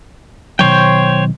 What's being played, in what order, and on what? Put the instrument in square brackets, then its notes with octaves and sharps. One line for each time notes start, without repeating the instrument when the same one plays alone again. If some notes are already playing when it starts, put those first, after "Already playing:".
[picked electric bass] B2 D#3 F#3 [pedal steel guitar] C5 C#5 G5